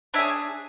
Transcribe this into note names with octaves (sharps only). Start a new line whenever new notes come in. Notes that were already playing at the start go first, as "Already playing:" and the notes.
D4 G#4 C#5 E5